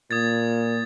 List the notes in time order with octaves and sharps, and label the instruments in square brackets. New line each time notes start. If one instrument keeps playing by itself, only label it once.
[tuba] A#2 [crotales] D#6 G#6 A6